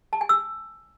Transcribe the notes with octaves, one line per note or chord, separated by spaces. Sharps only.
A5
G#5
E6